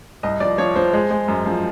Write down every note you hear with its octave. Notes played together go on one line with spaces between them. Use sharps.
C2 D#5
F3 D5
F3 C#5
F3 C5
G#3
G#3
F#2
F3